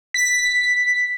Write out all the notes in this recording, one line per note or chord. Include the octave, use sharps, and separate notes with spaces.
B6